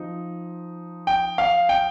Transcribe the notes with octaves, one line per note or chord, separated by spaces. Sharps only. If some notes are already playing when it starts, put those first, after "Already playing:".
Already playing: F3 C4 D#4
G5
F5
G5